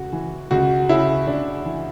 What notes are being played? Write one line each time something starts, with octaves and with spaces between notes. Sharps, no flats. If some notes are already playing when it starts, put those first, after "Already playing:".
Already playing: C#2 C#3 F#4
E3
C#2 F#4
C#3 E4
C#2 D4
E3